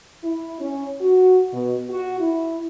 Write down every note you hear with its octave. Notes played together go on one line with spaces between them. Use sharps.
E4
C#4
F#4
B2
F#4
E4